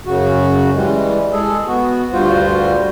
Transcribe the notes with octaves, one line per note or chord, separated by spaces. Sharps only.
F#2 C#3 F#4
E3 G3 G#3
G#3 G#4 A4
B3 F#4
D2 G2 G3 F4 F#4 C5